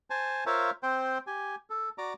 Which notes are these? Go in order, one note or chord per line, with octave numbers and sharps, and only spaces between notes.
C5 G#5 A5
F4 A#4 C5 C#5 E5 F5
C4 C5 G5
G4 G#5
A4
F#4 D5 A#5 D6